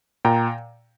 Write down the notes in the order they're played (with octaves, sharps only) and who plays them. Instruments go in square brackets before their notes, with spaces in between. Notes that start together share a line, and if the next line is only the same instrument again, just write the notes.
[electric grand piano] A#2 G5 A#5